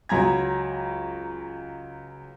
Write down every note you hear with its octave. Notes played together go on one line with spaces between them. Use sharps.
C#2 F#3 G#5 A#5 G#6